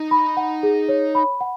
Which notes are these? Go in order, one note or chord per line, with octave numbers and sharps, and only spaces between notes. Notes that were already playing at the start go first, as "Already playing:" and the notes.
Already playing: D#4
B5
F#5
G#4
C#5
B5
F#5